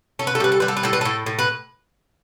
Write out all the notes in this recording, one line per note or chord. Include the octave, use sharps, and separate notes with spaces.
C#4 A4
B4
A4
G3 B4
A4
G3 B4
A4
B4
A2 A4
B4
A2 A4
A2
B4